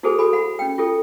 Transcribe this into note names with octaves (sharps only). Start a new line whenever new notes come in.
E4 F#4 G#4 A4 C5 G#5
F#4 A4 G#5 B5
F#5 B5
C#4 G5
F4 G4 A4